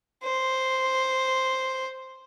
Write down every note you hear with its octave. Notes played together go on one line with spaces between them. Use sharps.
C5